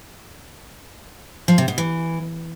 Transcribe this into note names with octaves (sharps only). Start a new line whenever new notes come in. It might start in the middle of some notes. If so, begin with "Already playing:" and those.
F3
C3
B2
E3